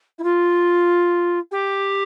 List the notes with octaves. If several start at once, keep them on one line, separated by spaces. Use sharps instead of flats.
E4
F4
G4